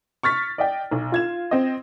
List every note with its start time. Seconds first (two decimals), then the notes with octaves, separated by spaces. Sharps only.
0.23 C#6 F6 A6 B6
0.58 D5 D#5 G5
0.91 B1
1.12 F4 G#6 E7
1.51 C4 D#5